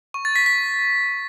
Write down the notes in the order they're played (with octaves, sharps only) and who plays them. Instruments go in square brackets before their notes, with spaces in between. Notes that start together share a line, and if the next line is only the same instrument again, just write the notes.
[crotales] C#6
A6
B6
B6